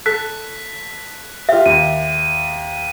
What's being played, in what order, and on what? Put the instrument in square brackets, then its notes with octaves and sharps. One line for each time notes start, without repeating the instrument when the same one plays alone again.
[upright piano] A4 [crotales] F#6 B6
[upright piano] F4 G4 [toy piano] E5
[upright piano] D#2 [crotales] D#7